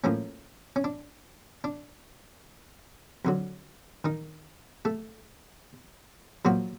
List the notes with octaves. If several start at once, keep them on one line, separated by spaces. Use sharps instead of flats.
A2 F3 A#3 C#4
C#4
D4
D4
F2 D3 F#3
D#3 D#4
A3 A4
A#2 F3 F#3 A#3 F#4